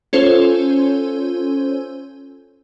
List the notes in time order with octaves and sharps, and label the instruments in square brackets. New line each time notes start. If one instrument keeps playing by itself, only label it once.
[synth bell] C#4 F4 A4 C5 C#5